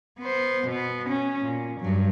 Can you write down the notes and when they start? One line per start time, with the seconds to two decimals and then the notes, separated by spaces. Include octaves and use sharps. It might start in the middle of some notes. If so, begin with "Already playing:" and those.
0.19 B3 C5
0.67 B2 B3
1.09 C#4
1.40 A#2
1.80 G2 F#3